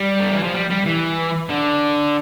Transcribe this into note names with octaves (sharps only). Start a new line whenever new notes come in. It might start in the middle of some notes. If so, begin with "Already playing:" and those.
Already playing: G3
D3
E3
F3
G3
G3
E3
D3